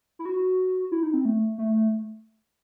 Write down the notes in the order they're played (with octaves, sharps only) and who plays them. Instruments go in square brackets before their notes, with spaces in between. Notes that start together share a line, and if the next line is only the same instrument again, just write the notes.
[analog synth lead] E4
F#4
E4
D#4
C4
A3
A3